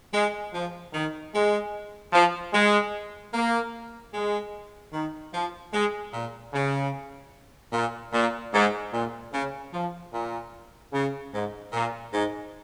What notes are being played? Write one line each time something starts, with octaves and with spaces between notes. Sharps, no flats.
G#3
F3
D#3
G#3
F3
G#3
A#3
G#3
D#3
F3
G#3
A#2
C#3
A#2
A#2
G#2
A#2
C#3
F3
A#2
C#3
G#2
A#2
G#2